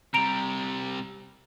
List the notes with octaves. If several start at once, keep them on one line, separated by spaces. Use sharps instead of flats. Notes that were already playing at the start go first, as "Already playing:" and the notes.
C3 G3 A#5 D7 F7